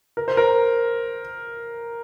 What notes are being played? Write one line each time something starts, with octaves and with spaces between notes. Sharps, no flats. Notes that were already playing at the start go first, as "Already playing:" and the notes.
A#4
C5
A#4